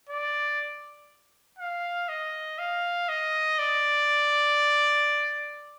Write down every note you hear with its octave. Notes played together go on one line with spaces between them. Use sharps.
D5
F5
D#5
F5
D#5
D5